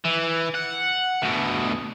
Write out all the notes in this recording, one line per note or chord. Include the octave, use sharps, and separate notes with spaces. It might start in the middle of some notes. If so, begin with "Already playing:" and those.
E3
F#5
D2 B2